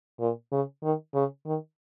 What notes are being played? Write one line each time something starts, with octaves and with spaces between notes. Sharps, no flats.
A#2
C#3
D#3
C#3
D#3